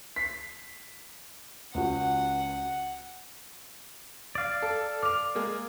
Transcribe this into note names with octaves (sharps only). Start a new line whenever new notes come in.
B6 C7
C#2 F#4 F#5
D5 F5
A4
D6 F6 F7
G#3 A#3 G#4